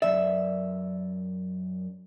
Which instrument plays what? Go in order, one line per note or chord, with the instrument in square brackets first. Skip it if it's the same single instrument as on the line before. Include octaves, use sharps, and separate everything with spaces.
[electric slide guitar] F#2 E3 D5 [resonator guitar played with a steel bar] E5